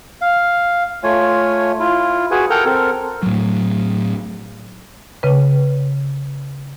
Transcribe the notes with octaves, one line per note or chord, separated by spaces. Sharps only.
F5
A3 F4 C#5 G#5
E4 F4
F#4 G#4 B4 G#5
A4 A#4 F#5 G5 A#5
C4 A4 A#4
A2 F#3
C#3 B4